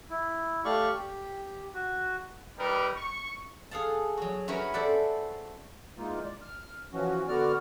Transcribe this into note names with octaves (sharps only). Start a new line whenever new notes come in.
E4
A3 G4 D5 F5 C#6
G4
F#4
G3 D#4 G4 A#4 B4
C#6
G#4 A4 F5 F#5 A5
F#3 F#4
C#4 E4 F#4 A#4 B4 C#5
A4 C5 D5 E5 F#5
E3 G#3 A#3 D#4 F4
D5
F6
E3 F3 C#4 F#4
D3 B3 F#4 D5 F6